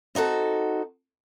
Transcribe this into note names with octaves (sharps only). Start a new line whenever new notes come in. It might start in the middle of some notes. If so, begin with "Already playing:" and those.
C4 D#4 F#4 A4